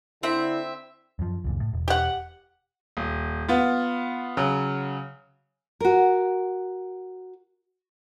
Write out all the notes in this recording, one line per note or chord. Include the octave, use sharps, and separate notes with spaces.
D3 C4 E4 E5
F#2 F3
C#2 F#2 A#2
A2
E1
G4 F#5
D#1
B3 F4
C#3 F#3
F#4 A#4